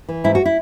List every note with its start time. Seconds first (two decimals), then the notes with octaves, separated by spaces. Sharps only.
0.09 E3
0.24 G#2 E4
0.35 F#4
0.45 E4